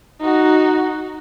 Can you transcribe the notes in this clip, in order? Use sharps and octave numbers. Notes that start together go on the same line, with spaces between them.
D#4 F#4